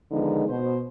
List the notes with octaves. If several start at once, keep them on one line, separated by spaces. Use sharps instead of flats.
D3 D#3 F3 G#3 B3 D#4
B2 C5